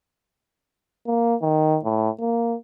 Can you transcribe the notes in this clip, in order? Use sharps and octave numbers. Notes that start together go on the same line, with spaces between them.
A#3
D#3
A2
A#3